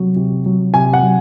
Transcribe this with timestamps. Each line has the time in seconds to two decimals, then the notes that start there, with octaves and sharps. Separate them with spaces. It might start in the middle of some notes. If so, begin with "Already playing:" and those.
Already playing: C3 F#3
0.16 C3
0.46 F#3
0.74 C3 G#5
0.94 F#5
1.02 F#3